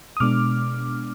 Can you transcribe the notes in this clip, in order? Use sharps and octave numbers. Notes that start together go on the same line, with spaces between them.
D#6
B2 G#3 B3 D4 D6 F6